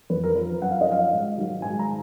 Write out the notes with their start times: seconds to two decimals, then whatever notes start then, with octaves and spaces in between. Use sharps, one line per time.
0.10 F2 B4
0.24 A#4
0.35 F3 B4
0.61 F#2 F#5
0.71 F5
0.81 D#5
0.87 F3 F5
1.13 G#2
1.38 D#3 F#3
1.62 G#2 G#5
1.79 A#5